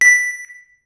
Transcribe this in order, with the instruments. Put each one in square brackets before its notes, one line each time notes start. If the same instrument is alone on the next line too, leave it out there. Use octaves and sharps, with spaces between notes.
[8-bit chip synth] B6